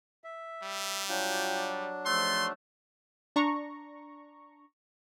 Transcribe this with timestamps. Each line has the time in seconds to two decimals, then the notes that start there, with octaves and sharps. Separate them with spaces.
0.24 E5
0.64 G3
1.09 F#3 D4 F4 F#4 G5
2.06 G#2 F3 A3 C6
3.36 D4 A#5 C#6